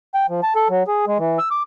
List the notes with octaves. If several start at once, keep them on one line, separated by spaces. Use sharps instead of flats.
G5
F3
A5
A4
F#3
G#4
G#3
E3
E6
D6